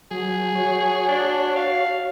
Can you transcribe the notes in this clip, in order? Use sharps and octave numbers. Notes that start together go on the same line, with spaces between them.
F#3 G#4
F#4 C#5
D4
F5